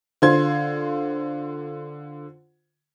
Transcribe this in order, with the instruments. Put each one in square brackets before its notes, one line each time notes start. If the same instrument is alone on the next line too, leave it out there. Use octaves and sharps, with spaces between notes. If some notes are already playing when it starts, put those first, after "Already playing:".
[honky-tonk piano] D3 F4 C5 C6 G#6